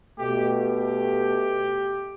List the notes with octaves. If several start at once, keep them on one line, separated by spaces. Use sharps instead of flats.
B2 A3 G4
G4